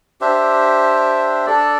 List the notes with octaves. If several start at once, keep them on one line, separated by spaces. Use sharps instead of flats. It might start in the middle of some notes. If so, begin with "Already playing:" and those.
D4 G4 C5 E5
D4 A4 D5